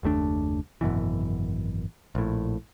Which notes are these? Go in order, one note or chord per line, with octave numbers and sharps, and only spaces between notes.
F#1 D#2 A3 D4
G#1 F#2 B2 E3
A#1 A2